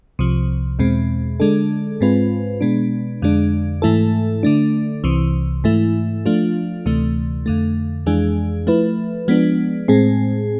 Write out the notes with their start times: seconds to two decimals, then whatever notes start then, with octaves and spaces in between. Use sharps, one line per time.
0.19 C2 C3 F3
0.79 E2 B2 G#3 C4
1.40 D3 G#3 D4 A4
2.01 G#2 G#3 C4 F4 B4
2.61 B2 G#3 B3 D4
3.22 F2 D3 G#3 D4
3.82 G#2 E3 A3 E4 A4
4.43 D3 A3 D4
5.04 C2 C3 E3
5.64 G#2 E3 A3 E4
6.26 F3 A3 D4 F4
6.86 D2 C3 E3 A3
7.46 F2 D3 A3
8.06 F2 E3 G#3 D4 G#4
8.67 F3 A3 E4 B4
9.28 F3 G#3 B3 D4
9.88 A2 G#3 C4 G#4